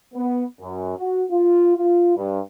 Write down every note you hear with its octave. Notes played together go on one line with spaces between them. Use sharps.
B3
F#2
F#4
F4
F4
G2